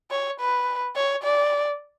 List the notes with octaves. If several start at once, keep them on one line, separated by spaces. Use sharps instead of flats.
C#5
B4
C#5
D5